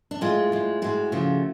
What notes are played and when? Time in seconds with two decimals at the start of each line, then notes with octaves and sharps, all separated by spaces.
0.11 D4
0.21 A2 G#3 F4
0.52 A2 G#3
0.82 A2 G#3 F#4
1.12 C#3 F3 A3